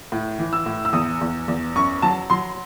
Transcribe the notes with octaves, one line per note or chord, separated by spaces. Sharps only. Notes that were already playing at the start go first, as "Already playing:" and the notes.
A2
E3
E6
A2
E6
E2 D#6
E2
E2
F#2 C#6
F#3 A5
F#3 C6